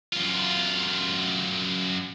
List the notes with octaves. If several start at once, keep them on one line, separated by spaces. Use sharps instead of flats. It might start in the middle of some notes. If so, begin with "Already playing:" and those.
F#2 F4